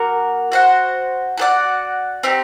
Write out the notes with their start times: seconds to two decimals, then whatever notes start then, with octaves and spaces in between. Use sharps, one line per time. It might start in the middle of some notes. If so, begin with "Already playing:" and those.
Already playing: A#3 F#4 A#4 F#5
0.52 F#4 C5 F#5
1.37 F#4 A4 D5 F#5
2.23 C4 D#4 G4